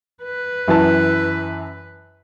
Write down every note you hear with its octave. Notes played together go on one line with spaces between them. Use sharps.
B4
F#2 E3 A5